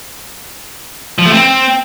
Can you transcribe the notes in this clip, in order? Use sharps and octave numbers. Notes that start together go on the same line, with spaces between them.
F3
A3
C4